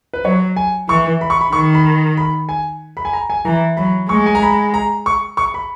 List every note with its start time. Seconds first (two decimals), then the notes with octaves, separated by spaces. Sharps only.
0.13 B4
0.25 F#3 C#5
0.57 G#5
0.89 E3 C#6
1.21 B5
1.30 C#6
1.41 B5
1.53 D#3 C#6
1.75 B5
2.17 B5
2.49 G#5
2.97 B5
3.05 G#5
3.13 A#5
3.30 G#5
3.45 E3 A#5
3.77 F#3 B5
4.09 G#3 C#6
4.26 G#5
4.35 A#5
4.42 B5
4.74 A#5
5.06 C#6
5.37 C#6
5.54 B5